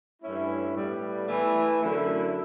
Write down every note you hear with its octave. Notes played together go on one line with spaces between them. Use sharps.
G2 E3 A3 C#4 E4
A2 G3 B3
E3 A3 E4
F#2 D3 A3 E4